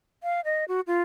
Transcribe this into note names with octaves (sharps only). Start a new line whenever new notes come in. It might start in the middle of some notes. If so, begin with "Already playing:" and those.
F5
D#5
F#4
F4